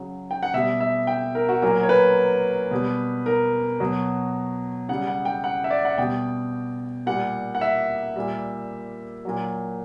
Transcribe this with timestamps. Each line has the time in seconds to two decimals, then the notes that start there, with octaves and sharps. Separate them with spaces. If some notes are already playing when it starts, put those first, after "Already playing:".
Already playing: C#3 F#3
0.31 G5
0.43 F#5
0.54 B2 G3 E5
0.81 E5
1.07 G5
1.35 A#4
1.49 F#4
1.62 A#2 F#3 A#4
1.83 C#5
1.89 B4
2.71 B2 G3
3.26 A#4
3.80 B2 F#3
4.89 C#3 G3 F#5
5.07 F#5
5.25 G5
5.44 F#5
5.64 E5
5.71 D5
5.85 F#5
5.98 B2 G3 G5
7.06 A#2 G3 F#5
7.55 F#5
7.61 E5
8.16 A#2 G3
9.25 A#2 F#3